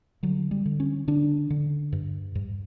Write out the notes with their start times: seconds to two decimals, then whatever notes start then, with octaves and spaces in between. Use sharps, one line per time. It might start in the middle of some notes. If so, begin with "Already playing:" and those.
0.23 D3 F#3
0.51 G3
0.66 D3
0.80 C#4
1.08 D3 D4
1.50 D3
1.92 G2
2.35 G2